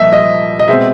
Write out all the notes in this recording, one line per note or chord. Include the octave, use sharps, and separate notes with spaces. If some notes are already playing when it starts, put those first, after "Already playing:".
Already playing: C2 A#2 F3 A#3 D#5 E5
D#5
D#5
B2 G#3 C4 E5